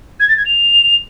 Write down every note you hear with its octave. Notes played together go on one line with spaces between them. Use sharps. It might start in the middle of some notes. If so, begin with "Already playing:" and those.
G#6
A6
G#6
F7